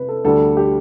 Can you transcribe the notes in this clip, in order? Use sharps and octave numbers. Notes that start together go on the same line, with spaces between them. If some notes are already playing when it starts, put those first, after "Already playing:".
Already playing: C3 B4
A4
D2 D3 G3 A4
G4